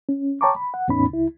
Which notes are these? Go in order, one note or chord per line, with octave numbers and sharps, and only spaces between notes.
C#4
C#5 G5 A5 A#5 C#6 D6
B5
F#5
E2 A2 B3 C#4 D#4 B5
C#2 E4